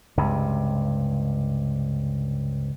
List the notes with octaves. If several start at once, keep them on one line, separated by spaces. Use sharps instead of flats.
C#2 G2 C3